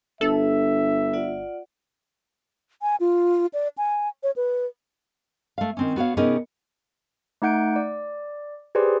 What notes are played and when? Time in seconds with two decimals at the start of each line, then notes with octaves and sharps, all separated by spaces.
0.21 G1 D4 A4 E5
1.13 F4 D5 F#5
2.82 G#5
3.00 F4
3.54 D5
3.78 G#5
4.23 C#5
4.36 B4
5.58 A3 F5
5.77 D#3 C4 C#4
5.96 B3 F#4 C#5 F5
6.17 C3 B3 C#4 D#4 G#4 A#4
7.42 A3 D#4 F#5 G6 D7
7.76 D5
8.75 G4 G#4 B4 C5 D5 C6